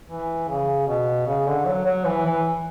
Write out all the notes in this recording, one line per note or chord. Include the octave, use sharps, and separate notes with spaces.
E3
C#3
B2
C#3
D3
F#3
F#3
E3
E3